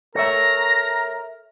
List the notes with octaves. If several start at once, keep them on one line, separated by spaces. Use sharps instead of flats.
A4 A#4 C#5 E5 A#5 A#6